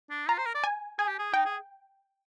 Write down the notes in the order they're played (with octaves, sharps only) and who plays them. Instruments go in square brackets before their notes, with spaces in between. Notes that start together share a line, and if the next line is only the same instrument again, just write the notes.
[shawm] D4
[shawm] F4 [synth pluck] A#5
[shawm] C5
A#4
D5
[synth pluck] G#5
[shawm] G#4 [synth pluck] G#5
[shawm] G4
G#4
[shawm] D#4 [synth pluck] G5
[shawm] G#4